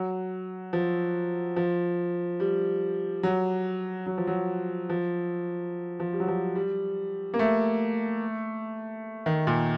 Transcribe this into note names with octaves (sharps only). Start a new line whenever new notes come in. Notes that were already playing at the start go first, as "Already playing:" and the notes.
Already playing: F#3
F3
F3
G3
F#3
F#3
F3
F#3
F3
F3
G3
F#3
F3
G3
A#3
A3
D#3
A#2